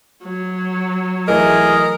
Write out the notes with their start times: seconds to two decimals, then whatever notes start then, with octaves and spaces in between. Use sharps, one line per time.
0.24 F#3
1.28 E3 A3 G#4 A#4 D#5